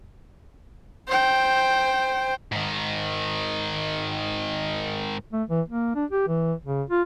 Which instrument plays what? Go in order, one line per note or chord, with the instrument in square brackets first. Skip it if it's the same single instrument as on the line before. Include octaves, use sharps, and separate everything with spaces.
[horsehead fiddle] C5 G5
[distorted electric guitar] G#2 D#3
[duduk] A3
E3
A#3
D4
G4
E3
C#3
F4